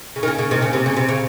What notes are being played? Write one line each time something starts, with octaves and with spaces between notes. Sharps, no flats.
C#3
D#3
C#3
C#3
C3 D#3
C#3
C3
C#3
C3
C#3